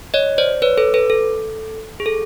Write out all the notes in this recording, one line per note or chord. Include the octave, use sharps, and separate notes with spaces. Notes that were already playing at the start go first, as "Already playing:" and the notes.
C#5 D#5
C5 D5
B4 C#5
A4 B4
A4 B4
A4
G#4
A4